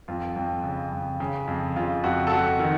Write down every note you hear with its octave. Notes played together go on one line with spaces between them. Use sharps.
F2 F4
F2
C#3
F2
C#3
F2
C#3 F4
F2 F#4
A4
F2 F#4
D#3